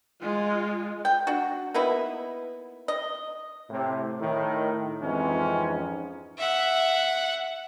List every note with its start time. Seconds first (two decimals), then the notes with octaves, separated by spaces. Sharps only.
0.21 G#3 F4
1.05 G5
1.27 D4 F#4
1.74 A#3 B3 D#4 E4
2.88 D#5
3.70 A2 C3
4.21 A2 D#3
5.01 F2 G#2 E3 C4 C#4 D#4
6.38 E5 F#5